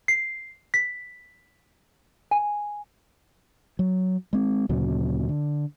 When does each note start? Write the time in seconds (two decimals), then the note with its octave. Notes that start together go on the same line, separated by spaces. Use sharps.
0.08 C7
0.74 B6
2.31 G#5
3.79 F#3
4.33 G#3 C4
4.69 D2 A#2 C#3 F#3
5.29 D3